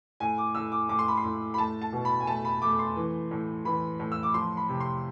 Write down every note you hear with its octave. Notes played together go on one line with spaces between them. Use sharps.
A2 G#5
D6
A2 E6
D6
A2 D6
C6
B5
C6
A2
B5
A3 A5
A5
B2
B5
G#5
A3 A5
B5
A3 D6
C6
E3
A2
E3 B5
A2
E6
D6
F3 C6
B5
C3
C6